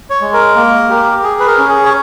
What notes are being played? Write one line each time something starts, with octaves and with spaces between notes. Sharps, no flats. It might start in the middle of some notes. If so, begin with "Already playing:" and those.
C#5
G#3
A#4
A#3
G4
G#4
B4
A#4
C#4
G#4
C#5